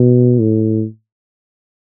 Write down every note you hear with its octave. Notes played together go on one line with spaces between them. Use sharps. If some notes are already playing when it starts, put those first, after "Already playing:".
Already playing: B2
A2